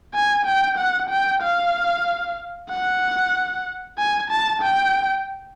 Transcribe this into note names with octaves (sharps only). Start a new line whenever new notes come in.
G#5
G5
F#5
G5
F5
F#5
G#5
A5
G5